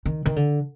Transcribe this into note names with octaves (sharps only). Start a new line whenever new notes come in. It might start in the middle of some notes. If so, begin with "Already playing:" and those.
D#3
D#3
D3